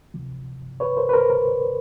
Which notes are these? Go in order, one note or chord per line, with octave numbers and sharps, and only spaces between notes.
D2 C3 F3
B4 C#5
A#4 C5
B4
A#4 C5
A#4